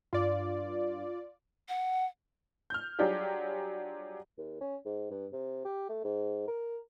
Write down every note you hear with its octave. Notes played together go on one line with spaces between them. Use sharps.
G2 F4 D5
F#5
F6 G6
F#3 G3 D4 F4 G4 G#4
D#2
C#4
G#2
G2
C3
G4
A3
G#2
A#4